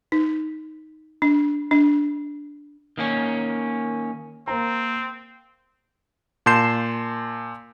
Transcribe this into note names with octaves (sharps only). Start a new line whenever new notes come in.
D#4
D4
D4
D#3 A#3 C#4
A#3 C4 C5 A#5
A#2 A5 C6 G6 C7 E7